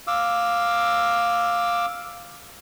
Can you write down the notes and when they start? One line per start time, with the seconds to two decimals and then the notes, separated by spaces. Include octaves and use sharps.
0.07 F5 D6 E6